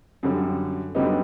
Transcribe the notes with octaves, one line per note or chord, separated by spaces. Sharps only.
F#2 D3 G3
F#2 D3 G3 B3 D#4